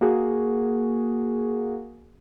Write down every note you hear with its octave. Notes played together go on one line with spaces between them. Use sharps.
A#3 F#4 G#4